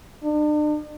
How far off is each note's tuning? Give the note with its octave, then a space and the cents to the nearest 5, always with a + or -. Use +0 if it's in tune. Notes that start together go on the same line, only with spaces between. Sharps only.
D4 +40